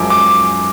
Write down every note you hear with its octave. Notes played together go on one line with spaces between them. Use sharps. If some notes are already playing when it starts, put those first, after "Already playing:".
Already playing: F#2 F3 G#3 D6
D6